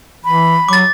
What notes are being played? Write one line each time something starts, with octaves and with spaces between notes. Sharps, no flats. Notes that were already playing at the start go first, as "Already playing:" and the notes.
E3 B5
F#3 D6 A6